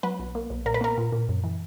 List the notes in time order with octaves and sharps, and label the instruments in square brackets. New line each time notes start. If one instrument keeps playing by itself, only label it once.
[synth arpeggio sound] F#3 B4
B1
A#3
B1
A#2 A#4
B4
A#3 A#4
A#2
A#2
F#2
E3